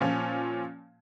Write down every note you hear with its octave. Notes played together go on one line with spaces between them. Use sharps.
A#2 F3 C#4